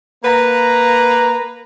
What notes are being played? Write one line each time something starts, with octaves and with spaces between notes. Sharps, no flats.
A#3 B4 A#5